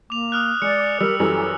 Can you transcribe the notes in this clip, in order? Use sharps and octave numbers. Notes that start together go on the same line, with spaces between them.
A#3 D6 F7
D#6 F6 F#6
G#3 D5 C#7
D6
G3 A#4 E6
F#2 E3 G3 A4